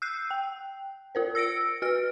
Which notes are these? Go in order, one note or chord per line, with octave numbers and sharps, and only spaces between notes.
E6 F#6 G6 C7
G5
F4 A#4 C5
E6 A#6 C#7 D7
F#4 B4 F6 D7